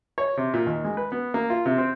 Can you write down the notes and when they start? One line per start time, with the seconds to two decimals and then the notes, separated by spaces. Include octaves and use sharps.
0.18 C#5
0.37 C3
0.54 A#2
0.66 D#2
0.84 G#3
0.97 B4
1.12 B3
1.34 A#3
1.50 F4
1.66 C3
1.78 C4